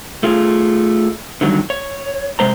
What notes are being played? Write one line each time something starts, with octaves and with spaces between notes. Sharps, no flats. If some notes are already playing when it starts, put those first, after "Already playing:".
A3 F4 G#4
D3 D#3 F#3 G3
C#5
C3 G#3 C5 A#5